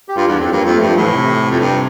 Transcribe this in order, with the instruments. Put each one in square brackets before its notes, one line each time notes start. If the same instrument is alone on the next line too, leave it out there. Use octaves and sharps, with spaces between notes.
[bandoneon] G4
[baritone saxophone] G2 [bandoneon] F4
[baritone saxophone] E2 [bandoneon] D4
[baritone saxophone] F2 [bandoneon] C4
[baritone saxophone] G2 [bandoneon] A#3
[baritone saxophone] F2 [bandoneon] C4
[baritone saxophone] G2 [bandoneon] A3
[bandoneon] F3
[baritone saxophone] A2 [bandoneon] E3
[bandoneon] C3
[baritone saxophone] F2
G2